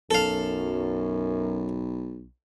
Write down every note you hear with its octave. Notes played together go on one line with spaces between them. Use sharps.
B1 F#2 A4 F5